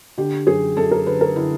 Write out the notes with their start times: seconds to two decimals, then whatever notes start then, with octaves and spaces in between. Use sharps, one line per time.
0.18 D3 G4
0.47 F#2 G#4
0.77 F#2 A4
0.91 A#4
1.07 D3 B4
1.21 A#4
1.36 D3 E4